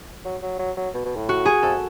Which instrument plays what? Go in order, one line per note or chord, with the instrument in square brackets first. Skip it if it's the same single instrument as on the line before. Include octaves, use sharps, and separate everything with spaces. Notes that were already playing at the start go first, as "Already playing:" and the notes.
[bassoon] F#3
F#3
F#3
F#3
B2
B2
A2
[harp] F#4
G#4
[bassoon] F2 [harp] A4